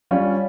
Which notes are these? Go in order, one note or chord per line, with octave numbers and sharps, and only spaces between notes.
G3 C#4 F4